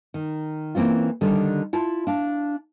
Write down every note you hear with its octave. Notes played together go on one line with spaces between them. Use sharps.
D#3
E3 A#3 C4 C#4 F4
D3 D#3 G3 D4 A4
E4 F4 A5
D4 F5